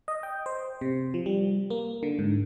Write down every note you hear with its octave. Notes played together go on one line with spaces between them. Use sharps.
D#5
G5
C5
C3
F3
G3
A#3
D3
G#2